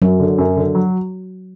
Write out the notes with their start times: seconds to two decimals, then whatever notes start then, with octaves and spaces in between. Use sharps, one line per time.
0.02 F#2 F#3
0.20 D3
0.38 F#2
0.57 D3
0.75 F#3